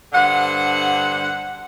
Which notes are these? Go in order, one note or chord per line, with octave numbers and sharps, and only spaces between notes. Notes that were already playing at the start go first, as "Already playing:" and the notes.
G2 D3 C5 F#5